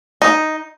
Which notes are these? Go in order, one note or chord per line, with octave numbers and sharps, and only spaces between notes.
D#4